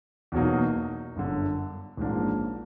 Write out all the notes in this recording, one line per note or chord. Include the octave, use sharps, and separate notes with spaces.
E2 B2 F#3 A#3 D#4
G1 F#2 D3
A1 G#2 F3 A#3 D4